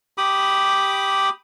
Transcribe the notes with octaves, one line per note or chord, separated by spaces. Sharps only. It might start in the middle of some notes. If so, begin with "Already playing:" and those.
G4 B5 D6 D#6